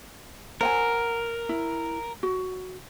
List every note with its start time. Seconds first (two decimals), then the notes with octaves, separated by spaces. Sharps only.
0.61 A#4 C5 F#5 G#5
1.49 E4
2.23 F#4